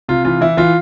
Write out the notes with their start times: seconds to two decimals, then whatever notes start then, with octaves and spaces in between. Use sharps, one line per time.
0.08 C3 F4
0.25 E3 F4
0.41 E3 E4
0.57 E3 F4